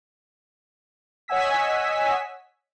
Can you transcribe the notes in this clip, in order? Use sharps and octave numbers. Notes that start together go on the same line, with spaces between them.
C#5 D#5 F#5 G#5 E6 B6